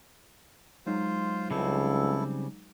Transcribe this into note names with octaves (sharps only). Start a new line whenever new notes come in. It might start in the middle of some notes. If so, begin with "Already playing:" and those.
F#3 G#3 D#4 F4 C5
C#2 C#3 G3 C4 E4 A4